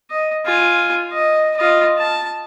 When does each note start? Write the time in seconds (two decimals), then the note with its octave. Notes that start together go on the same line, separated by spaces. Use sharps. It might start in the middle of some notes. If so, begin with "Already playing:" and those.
0.11 D#5
0.46 F4 G#5
1.13 D#5
1.57 F4 D#5
1.98 A5